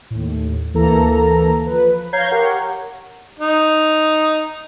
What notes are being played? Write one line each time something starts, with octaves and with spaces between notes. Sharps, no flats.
D#2 A2
D2 E3 A#3 A4 A#5
F3 B4
C#5 F5 A#5 G6 G#6 C7
G4 A#4 C#5 F#5
D#4